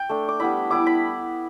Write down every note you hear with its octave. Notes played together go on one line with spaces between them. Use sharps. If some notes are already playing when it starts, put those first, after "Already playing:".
Already playing: G5
A3 D4
D6
G3 B3 E4 B5
G3 B3 E4 D6
B5